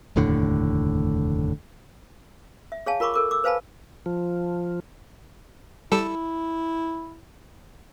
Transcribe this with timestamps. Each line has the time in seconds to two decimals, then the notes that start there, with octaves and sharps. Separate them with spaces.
0.16 F1 D#2 A2 D3
2.72 E5
2.86 G#4 C#5 F5 G#5 A5
3.00 F4 A#4 B5 C#6 D6
3.14 A4 A#4 D6
3.31 D6 E6
3.44 B4 C5 F5 G#5 A5 B5
4.06 F3
5.92 G3 E4 A4 E6